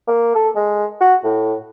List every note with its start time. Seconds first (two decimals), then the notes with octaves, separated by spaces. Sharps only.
0.08 A#3
0.35 A4
0.56 G#3
1.00 F#4
1.24 A2